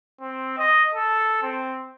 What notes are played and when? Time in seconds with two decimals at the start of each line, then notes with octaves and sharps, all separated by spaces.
0.21 C4
0.58 D#5
0.95 A4
1.43 C4